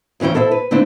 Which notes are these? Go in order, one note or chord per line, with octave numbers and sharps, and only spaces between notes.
D2 E3 C#4 E4 G5
E4 A4 C5 D#5 E5
B4
D3 A3 C4 D4 E4